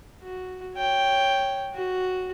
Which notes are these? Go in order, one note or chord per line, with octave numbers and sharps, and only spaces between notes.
F#4
C#5 G5
F#4